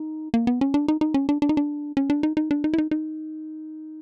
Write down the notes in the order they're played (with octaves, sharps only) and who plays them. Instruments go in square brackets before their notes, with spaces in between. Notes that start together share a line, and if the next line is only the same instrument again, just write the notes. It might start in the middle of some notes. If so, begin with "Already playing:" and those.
Already playing: [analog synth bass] D#4
A#3
B3
C#4
D4
D#4
D#4
C#4
D4
D4
D#4
D4
C#4
D4
D#4
D#4
D4
D#4
E4
D#4
D#4